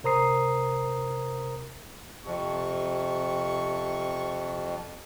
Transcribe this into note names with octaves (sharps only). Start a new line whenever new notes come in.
C3 A#4 C5 A#5 D#6 C7
F2 C3 C#6